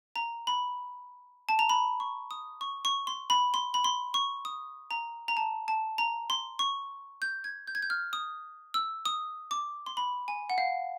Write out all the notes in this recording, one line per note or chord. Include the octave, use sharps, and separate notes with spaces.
A#5
B5
A5
A#5
B5
C#6
D#6
C#6
C#6
C6
B5
C6
B5
C6
C#6
D#6
A#5
A#5
A5
A5
A#5
C6
C#6
G6
G#6
G6
G#6
G6
F6
D#6
E6
D#6
D6
C6
B5
G#5
F#5
F5